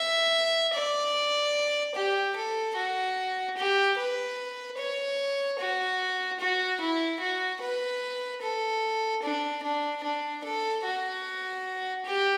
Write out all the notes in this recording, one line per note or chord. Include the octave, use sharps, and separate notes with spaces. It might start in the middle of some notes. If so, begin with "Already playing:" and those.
Already playing: E5
D5
G4
A4
F#4
G4
B4
C#5
F#4
F#4
E4
F#4
B4
A4
D4
D4
D4
A4
F#4
G4